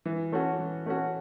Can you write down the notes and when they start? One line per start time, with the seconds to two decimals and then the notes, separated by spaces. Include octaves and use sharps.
0.05 E3
0.32 A3 C#4 F#4
0.59 E3
0.86 A3 C#4 F#4